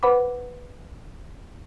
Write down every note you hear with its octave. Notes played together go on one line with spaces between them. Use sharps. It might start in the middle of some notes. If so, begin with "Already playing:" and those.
B4 C5 F#5 B5 D6